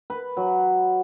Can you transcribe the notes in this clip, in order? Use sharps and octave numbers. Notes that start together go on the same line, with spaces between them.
B4
F#3